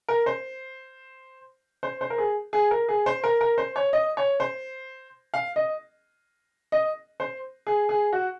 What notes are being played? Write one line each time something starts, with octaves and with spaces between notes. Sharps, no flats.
A#4
C5
C5
C5
A#4
G#4
G#4
A#4
G#4
C5
A#4
A#4
C5
C#5
D#5
C#5
C5
F5
D#5
D#5
C5
G#4
G#4
F#4